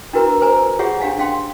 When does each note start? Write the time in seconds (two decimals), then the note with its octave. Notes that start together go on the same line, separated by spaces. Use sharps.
0.13 D4 E4 F#4 A#4 B4 A#5
0.41 A#4 C5 G#5 A#5
0.79 F4 G4 G#4 C#5 E5 F#5
1.00 D4 G4 F5 G#5
1.19 C#4 F5 G5 C6